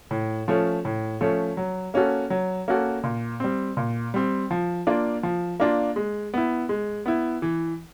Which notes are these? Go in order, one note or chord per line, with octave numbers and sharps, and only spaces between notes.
A2
F3 A3 C#4
A2
F3 A3 C#4
F#3
A#3 C#4 F#4 A4
F#3
A#3 C#4 F#4 A4
A#2
G3 C4
A#2
G3 C4
F3
A#3 D4 F4
F3
A#3 D4 F4
G#3
B3 E4
G#3
B3 E4
E3